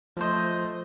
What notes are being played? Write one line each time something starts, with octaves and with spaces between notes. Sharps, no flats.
F3 A3 C5 D#5